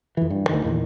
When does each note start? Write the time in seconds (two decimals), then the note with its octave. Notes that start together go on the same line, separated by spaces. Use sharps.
0.17 F2 E3
0.30 G2
0.49 D2 D#3
0.64 E2 A#2 D#3